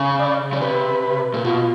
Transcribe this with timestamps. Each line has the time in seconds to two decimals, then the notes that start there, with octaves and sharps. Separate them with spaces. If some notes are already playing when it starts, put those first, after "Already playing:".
Already playing: C#3
0.19 D5
0.53 C#3
0.61 C3 B4
1.34 A#2
1.45 B2 F4